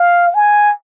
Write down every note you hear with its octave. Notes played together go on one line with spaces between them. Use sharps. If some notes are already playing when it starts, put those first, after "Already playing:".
Already playing: F5
G#5